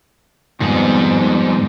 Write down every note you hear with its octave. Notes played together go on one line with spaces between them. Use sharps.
F2 G#2 D#3 G3 B3